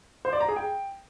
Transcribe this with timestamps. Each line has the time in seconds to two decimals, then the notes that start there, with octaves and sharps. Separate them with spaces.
0.25 C5
0.33 D5
0.41 A#5
0.48 G#4
0.56 G5